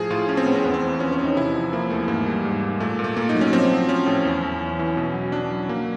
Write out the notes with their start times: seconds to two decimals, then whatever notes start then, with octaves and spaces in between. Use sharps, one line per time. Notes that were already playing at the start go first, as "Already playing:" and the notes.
Already playing: A2 F3 G#4
0.10 A2 F4
0.29 A2 C#4
0.37 C4
0.46 A2 B3
0.55 C4
0.64 E2 B3
0.74 C4
0.82 E2
1.00 F3 C#4
1.12 C#4
1.19 E2
1.24 D#4
1.37 C3 E4
1.54 F3
1.73 F3 A#3
1.90 E2 A3
2.08 G#2 A#3
2.26 G3
2.45 G#2
2.62 G#2
2.80 A#2 A3
2.99 A#2
3.04 A3
3.17 A#2 A#3
3.29 D#4
3.35 F#3
3.41 C#4
3.53 F3 C4
3.71 F3
3.89 F3 C#4
4.06 A2
4.25 E2
4.43 E2
4.61 E2
4.79 E3
4.97 B2
5.14 F#3
5.32 F#3 D4
5.51 F#3
5.69 F#3 A#3